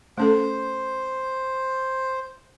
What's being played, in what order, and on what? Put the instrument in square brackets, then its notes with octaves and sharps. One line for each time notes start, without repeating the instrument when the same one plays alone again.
[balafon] A3 C#4 A4 [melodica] C5